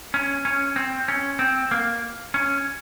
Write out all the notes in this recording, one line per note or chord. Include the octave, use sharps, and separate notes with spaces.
C#4
C#4
C4
C#4
C4
A#3
C#4